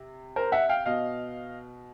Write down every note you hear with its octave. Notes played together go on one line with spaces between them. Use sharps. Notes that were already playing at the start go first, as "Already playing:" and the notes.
Already playing: C3
A#4 C5
E5 F#5
F5 G5
B2 D#5 F5